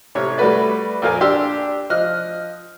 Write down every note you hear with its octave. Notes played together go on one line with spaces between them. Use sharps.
A1 C3 C#5
G3 A3 F#4 B4 D5
F2 A#2 A#4 F5 G#5
D4 G4 C6 E6
F3 D#5 F6 F#6